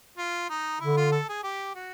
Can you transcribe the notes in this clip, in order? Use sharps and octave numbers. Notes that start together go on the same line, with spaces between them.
F4
D#4
D3 E4
F4
A4
G#4
G4
F#4